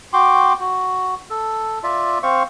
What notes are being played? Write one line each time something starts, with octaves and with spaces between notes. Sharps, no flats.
F#4 G5 C6 D6
F#4
A4
F4 D5 E5
C4 C5 F5 C#6